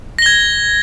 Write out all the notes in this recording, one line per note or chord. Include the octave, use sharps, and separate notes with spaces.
G#6 A#6 G7